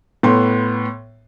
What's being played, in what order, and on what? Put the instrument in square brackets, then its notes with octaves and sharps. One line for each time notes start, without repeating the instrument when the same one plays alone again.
[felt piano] A2 B3 C6